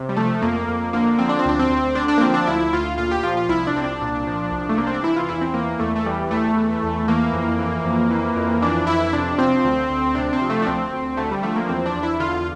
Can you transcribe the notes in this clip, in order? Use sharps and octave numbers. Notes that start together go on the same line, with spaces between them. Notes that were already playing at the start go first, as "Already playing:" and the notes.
Already playing: C3
G3
F3 A3
F2 A#3
F2
D3 A#3
F3 C4
D4
C4
D2 D4
C4
D2
D3 D4
D4
A#3
F3 C4
D4
D2 E4
D2 F4
A#2 F4
G4
F3 F4
F4
C2 E4
D4
C2 C4
D4
A#2
F3
C2
A3
C2 A#3
C4
D4
E3 E4
F4
E2 E4
C4
E3 A#3
E2 A3
A3
E3 G3
E2 A3
E3
E2
E3 A#3
F2
E3
F2
E3
F2
E3 D4
F2 E4
C3 D4
F3 C4
D2
D2
C3 D4
C4
F3
A3
D4
D2 C4
D2
D3 A3
G3
F3 A3
A#3
E2 C4
D4
E2
E4
D3 F4